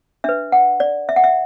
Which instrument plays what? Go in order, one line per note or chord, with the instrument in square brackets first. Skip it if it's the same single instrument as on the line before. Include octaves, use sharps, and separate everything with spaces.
[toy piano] D4 B4 E5
F#5
D5
E5
F#5
E5